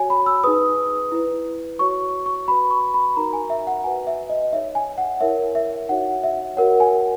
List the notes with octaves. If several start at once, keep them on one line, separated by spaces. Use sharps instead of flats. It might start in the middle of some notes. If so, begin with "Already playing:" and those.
Already playing: F#4 C#5 G#5
B5
E6
D#4 G#4 B4 D#6
E4 B4
F#4 C#5 C#6
C#6
F#4 B4 B5
C#6
B5
D#4 F#4 A#4 A#5
G#5
E5
F#5
F#4 B4 G#5
E5
D#5
D#4 G#4 C#5 E5
G#5
F#5
E4 A#4 C#5 E5
E5
D#4 F#4 C#5 F#5
E5
F#4 A#4 C#5 F#5
G#5